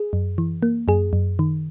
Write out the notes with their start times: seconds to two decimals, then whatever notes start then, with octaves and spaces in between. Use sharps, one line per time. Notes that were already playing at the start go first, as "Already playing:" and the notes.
Already playing: G#4
0.13 F#2
0.38 E3
0.63 A#3
0.88 F#2 G#4
1.13 F#2
1.39 D#3